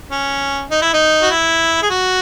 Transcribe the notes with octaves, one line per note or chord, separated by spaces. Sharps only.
C#4
D#4
E4
D#4
F#4
E4
G#4
F#4